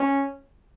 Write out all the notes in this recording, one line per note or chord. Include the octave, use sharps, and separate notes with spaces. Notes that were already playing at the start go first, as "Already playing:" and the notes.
Already playing: C#4